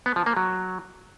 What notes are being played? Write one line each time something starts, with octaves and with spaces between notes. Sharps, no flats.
B3
F3
A#3
F#3